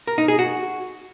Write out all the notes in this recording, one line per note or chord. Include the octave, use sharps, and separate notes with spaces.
A#4
D#4
G#4
F#4